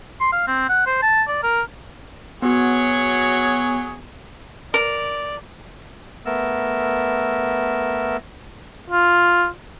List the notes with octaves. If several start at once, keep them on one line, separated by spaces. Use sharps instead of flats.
C6
F5
C4
F#5
C5
A5
D5
A#4
F#3 B3 F#4 G#4 C#5
A#4 D5
A3 B3 A#4 E6
F4